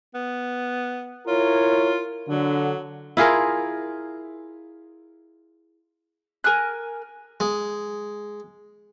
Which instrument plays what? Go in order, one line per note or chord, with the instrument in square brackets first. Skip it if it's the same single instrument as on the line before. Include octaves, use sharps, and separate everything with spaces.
[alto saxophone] B3
[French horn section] E4 A#4 C#5 [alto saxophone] F4
[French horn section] D3 [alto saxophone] F#3
[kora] E4 F4 G#4 A#4
[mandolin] A#4 G#5 F6 F#6
[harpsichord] G#3